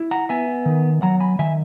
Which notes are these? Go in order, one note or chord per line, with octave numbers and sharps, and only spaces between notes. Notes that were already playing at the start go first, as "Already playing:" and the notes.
Already playing: E4
F#5 A#5
B3 E5 G#5
D#3
F#3 F#5 A#5
G#5 B5
D#3 E5 G#5